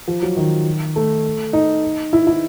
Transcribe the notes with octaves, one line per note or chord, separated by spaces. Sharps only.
F3
F#3
D#3
A3
D#4
E4
E4